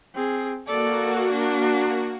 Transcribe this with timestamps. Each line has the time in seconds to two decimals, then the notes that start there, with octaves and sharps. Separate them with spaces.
0.14 C4 G#4
0.67 A#3 F#4 A4 D5
1.32 D4